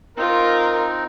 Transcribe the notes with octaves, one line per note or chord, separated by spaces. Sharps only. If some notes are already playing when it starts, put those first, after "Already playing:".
C4 D#4 F4 A#4